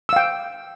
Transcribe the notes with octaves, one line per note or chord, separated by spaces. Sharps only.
F5 G5 E6